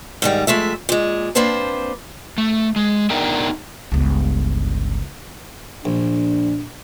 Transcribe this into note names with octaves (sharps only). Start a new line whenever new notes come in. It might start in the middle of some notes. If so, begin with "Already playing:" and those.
G#2 D#3 G3
F2 G#3 A3 E5
A#2 G#3
A#3 C4 D4 B4 C5 A5
A3
G#3
B3 D4 D#4 A#4 E5 G5
G1 C#2
A#1 D4